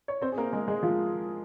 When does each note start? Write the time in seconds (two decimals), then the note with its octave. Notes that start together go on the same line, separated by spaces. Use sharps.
0.08 C#5
0.22 C4 C5
0.32 G#4
0.38 A#3 A#4
0.52 G#3 G#4
0.68 G#3 G#4
0.83 F3 F4